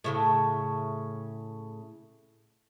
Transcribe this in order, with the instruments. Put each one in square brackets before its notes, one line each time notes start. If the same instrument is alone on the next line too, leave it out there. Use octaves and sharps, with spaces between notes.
[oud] A2 C#3 A3